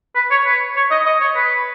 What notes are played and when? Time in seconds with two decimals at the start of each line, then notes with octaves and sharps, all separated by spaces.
0.15 B4
0.31 C#5
0.45 B4
0.76 C#5
0.91 D#5
1.06 D#5
1.21 C#5
1.36 B4